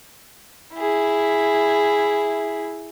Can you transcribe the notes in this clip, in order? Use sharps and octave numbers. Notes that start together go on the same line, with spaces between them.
E4 G#4